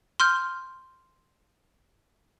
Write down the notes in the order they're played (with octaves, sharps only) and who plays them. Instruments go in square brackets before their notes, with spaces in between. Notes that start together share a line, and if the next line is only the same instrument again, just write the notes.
[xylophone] C6 F6 G6